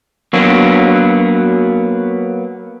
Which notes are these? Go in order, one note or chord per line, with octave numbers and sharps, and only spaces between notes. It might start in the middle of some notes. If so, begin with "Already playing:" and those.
F#3 A#3 B3 D4 F#4